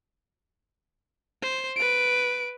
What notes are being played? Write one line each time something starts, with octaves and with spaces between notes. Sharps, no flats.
C5
B4 D7